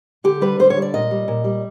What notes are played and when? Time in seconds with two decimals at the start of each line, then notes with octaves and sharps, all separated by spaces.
0.24 D3 G4
0.41 G3 B4
0.59 D3 C5
0.70 C#5
0.77 G3
0.82 D5
0.94 A#2 D#5
1.11 G3
1.28 A#2
1.44 G3